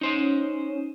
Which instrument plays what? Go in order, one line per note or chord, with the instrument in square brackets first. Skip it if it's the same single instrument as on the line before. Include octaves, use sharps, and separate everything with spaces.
[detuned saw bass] C#4 [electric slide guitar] D#4 C5 D#5